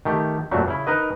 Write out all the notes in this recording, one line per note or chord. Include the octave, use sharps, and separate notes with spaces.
D#3 A3 G4
F#2 A#2 F#3 G3 A3
C#3 E4
D#4 A#4 B4 D#5